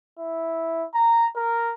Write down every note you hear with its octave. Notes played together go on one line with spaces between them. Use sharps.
E4
A#5
A#4